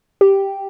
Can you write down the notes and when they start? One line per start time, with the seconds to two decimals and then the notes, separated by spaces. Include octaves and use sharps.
0.21 G4